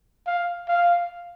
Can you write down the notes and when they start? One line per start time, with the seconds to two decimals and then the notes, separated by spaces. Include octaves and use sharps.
0.26 F5
0.68 F5